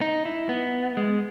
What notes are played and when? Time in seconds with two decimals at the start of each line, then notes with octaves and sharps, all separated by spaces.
0.01 D#4
0.25 E4
0.49 B3
0.97 G#3